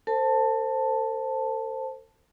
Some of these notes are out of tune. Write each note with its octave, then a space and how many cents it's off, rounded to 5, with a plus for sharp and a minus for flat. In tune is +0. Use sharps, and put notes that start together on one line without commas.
A4 +45 C5 +0 A5 +0